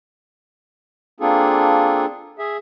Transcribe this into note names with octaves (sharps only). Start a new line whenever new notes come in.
A#3 C4 D4 F4 G#4 A4
G#4 E5